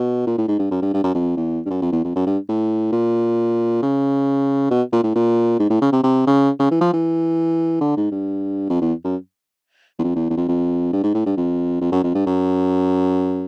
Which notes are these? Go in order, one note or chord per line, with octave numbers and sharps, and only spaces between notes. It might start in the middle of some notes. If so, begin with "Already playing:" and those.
Already playing: B2
A#2
A2
G#2
G2
F#2
G2
G2
F#2
F2
E2
G2
F#2
F2
E2
F2
F#2
G2
A2
A#2
C#3
B2
A#2
A2
A#2
G#2
A2
C#3
C3
C3
C#3
C#3
E3
F3
E3
D3
G#2
G2
F2
E2
F#2
E2
F2
E2
E2
F2
F2
G2
G#2
A2
G2
F2
F2
F#2
F2
G2
F#2